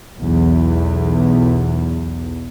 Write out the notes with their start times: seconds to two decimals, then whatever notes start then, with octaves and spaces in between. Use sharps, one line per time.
0.19 B1 E2